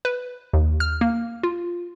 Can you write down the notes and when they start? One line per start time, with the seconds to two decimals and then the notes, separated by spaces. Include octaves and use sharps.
0.05 B4
0.53 D#2
0.80 F6
1.01 A#3
1.43 F4